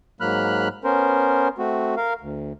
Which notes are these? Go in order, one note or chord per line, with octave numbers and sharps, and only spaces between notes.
G#2 F#3 A#3 B5 F6 F#6
B3 C#4 A#4 C5
A3 C4 F#4
A#4 F5
D2